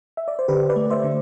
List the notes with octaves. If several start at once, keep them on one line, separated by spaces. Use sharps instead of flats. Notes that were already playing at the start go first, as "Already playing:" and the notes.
E5
D5
C5
D3 G4 B4
B4 D5
A3
C5 E5
D3